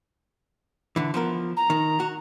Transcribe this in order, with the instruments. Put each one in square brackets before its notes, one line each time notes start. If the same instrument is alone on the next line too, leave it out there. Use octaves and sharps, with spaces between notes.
[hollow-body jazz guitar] D3 E3
F3 B3 A#4
[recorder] A#5
[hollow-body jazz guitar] D#3
F#4